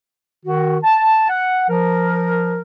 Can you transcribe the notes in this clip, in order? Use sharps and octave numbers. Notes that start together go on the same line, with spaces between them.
D#3 F#4
A5
F#5
F3 A#4